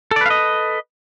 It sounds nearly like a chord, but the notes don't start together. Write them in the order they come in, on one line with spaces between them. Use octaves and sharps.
A4 D5 B4 F5 D#5